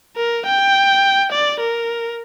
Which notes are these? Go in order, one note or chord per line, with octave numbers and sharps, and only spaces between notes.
A#4
G5
D5
A#4